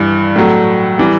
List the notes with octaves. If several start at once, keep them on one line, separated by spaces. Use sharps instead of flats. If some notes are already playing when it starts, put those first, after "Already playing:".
Already playing: G2 E3 G3
A2 F#3 A3
E3 G3